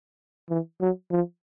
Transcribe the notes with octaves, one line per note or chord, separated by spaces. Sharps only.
E3
F#3
F3